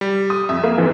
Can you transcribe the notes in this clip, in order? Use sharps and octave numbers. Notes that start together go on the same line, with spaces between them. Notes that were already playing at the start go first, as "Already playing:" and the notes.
G3
D#6
F2 E5
A#3
F2 G#2 E3 B3